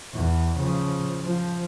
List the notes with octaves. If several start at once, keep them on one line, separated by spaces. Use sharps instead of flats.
E2
C#3 F3
F3